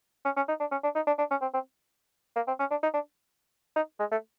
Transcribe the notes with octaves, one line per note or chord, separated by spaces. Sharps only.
C#4
C#4
D#4
D4
C#4
D4
D#4
D4
D4
C#4
C4
C4
A#3
C4
C#4
D4
D#4
D4
D#4
G#3
A3